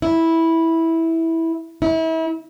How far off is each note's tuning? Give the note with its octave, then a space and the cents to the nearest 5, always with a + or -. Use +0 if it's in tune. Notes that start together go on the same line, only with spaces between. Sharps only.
E4 -10
E4 -35